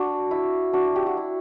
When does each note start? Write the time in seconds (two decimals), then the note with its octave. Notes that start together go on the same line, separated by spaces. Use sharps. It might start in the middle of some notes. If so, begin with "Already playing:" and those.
Already playing: D4 F#4
0.31 E4
0.73 D4 F#4
0.96 G4
1.06 F#4
1.17 E4